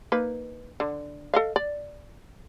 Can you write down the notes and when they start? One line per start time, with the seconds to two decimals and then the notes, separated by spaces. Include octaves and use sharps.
0.12 A#3 D#4 B4
0.80 D3
1.34 A4 D#5 F5
1.56 D5